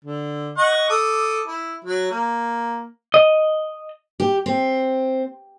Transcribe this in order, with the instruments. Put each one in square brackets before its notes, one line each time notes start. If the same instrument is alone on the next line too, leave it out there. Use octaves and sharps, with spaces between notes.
[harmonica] D3
D#5 F#5 C#6
A4 D6 D#6
E4
F#3
A#3
[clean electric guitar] D#5
[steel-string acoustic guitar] G4
C4